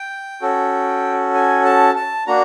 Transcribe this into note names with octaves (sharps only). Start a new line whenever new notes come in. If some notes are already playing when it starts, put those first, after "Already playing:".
Already playing: G5
C#4 F#4 A4
G#5
A5
A5
A#3 D4 F#4 A#5